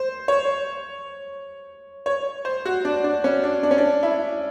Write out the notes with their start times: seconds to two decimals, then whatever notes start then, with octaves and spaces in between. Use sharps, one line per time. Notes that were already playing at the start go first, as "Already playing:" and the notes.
Already playing: C5
0.28 C#5
2.06 C#5
2.45 C5
2.65 F#4
2.85 D4
3.04 D4
3.24 C#4
3.44 D4
3.63 D4
3.71 C#4
3.78 D4
4.03 E4